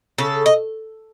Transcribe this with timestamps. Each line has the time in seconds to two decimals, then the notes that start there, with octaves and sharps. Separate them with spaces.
0.18 C#3 A4
0.46 D#5